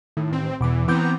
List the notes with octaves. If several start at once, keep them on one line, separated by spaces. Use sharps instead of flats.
A2 D#3
A1 C4
E2 B2 E3 D6
E3 B3 C4 A#5 D6 G6